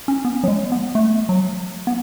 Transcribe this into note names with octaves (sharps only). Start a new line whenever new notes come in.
C#4
B3
F#3
G#3
B3
A3
F#3
B3